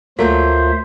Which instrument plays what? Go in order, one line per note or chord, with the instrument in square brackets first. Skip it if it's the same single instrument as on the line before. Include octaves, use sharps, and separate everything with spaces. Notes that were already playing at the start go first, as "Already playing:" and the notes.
[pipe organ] D2 F4 E5 [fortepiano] F#3 A3 [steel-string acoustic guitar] A#3 [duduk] C5